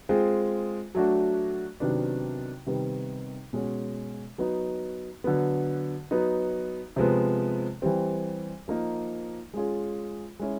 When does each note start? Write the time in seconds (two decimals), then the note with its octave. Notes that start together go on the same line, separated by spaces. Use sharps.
0.09 G#3 C4 F4 G#4
0.95 F#3 A3 D4 F#4
1.80 C3 D#3 F#3 B3 D4
2.67 C3 D#3 G3 B3
3.53 B2 G#3 C#4 F#4
4.38 F#3 B3 D#4
5.24 D3 F#3 B3
6.11 F#3 B3 D#4
6.96 C3 F3 G#3 B3
7.82 E3 G3 C4
8.68 F3 A#3 D#4
9.54 G#3 C#4 F4 G#4
10.40 G#3 C#4 E4